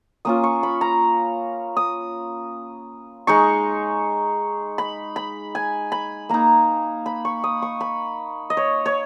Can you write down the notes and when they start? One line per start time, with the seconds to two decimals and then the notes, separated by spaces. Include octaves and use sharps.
0.25 A#3 C#4 F4 D#6
0.44 C#6
0.63 B5
0.81 A#5
1.77 D#6
3.27 G#3 D#4 C#6
4.78 B5
5.16 B5
5.55 G#5
5.92 B5
6.29 A#3 D#4 A#5
7.06 B5
7.25 C#6
7.44 D#6
7.62 C#6
7.81 B5
8.50 D#5
8.57 C#5
8.86 C#5